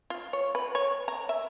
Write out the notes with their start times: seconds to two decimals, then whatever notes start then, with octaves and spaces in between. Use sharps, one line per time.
0.10 F4
0.33 C#5
0.55 B4
0.75 C#5
1.08 A#5
1.29 E5